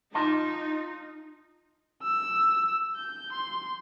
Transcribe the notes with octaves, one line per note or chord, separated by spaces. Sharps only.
D#4 F4 D#5 A5
E6
G6
C6